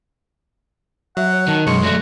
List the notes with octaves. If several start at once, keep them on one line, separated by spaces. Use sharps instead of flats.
F#3 E5 F#5
C#5
D#3 A5
B1 F#2 G#3 C6 C#6
F#3 A3 F#4